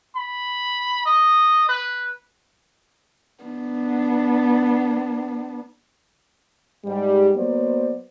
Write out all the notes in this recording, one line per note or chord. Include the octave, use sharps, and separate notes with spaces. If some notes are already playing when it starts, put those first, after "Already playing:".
B5
D#5
B4
B3 D4
G#2 G3
F#3 A#3 B3 C5 D5